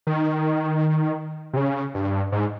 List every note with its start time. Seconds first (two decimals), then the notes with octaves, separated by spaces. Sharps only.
0.07 D#3
1.53 C3
1.57 C#3
1.94 G2
2.32 G#2